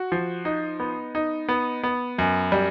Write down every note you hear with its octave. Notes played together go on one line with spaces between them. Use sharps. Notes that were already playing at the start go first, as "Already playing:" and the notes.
Already playing: F#4
F3
D#4
B3
D#4
B3
B3
F#2
G3